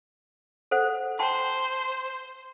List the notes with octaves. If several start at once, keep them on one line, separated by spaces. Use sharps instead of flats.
A4 C5 F#5
C5 G5 A5 C6